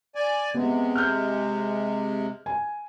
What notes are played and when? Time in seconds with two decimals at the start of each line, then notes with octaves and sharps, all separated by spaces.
0.15 D5 G#5
0.54 C3 G#3 B3
0.95 F6 G6
2.46 G#5